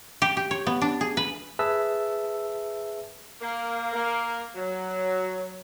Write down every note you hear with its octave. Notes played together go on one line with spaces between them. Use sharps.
G4
G4
C#5
B3
D4
G#4
B4
G#4 B4 E5 A5 E6
A#3
A#3
F#3